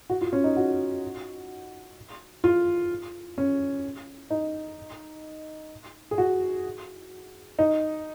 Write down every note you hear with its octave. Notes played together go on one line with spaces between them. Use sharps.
F#4
F4
C#4
D#4
F#4
F4
C#4
D#4
G#4
F#4
D#4